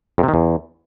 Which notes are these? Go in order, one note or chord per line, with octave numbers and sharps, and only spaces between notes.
F2
C3
D#3
E2